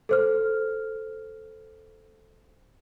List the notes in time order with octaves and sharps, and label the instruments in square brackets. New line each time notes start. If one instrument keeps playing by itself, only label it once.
[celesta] A4 C5 F6